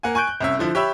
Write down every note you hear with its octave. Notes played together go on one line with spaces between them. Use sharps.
A#3 F#5 G#5
G#5 C#6 F#6 G6 D7
F#6
C2 C#4 E5
D3 F3 E4
G4 C#5 E5 B5 E6